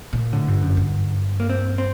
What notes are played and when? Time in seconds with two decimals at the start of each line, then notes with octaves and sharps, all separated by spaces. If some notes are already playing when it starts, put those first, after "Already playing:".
0.13 A#2
0.32 A2 D3
0.48 G2
0.62 F#2
0.77 G2
1.40 A#3
1.49 C4
1.78 C4